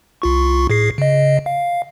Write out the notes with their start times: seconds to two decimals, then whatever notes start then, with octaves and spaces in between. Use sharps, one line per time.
0.22 C2 F4 C#6
0.70 A2 G#4 C7
0.98 C#3 D#5
1.46 F5